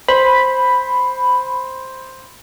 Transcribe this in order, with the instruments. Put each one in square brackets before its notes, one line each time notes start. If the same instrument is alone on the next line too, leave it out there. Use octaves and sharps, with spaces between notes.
[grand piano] C5 [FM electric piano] B5